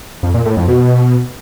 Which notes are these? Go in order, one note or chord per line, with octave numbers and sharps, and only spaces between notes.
F2
A#2
A2
F2
B2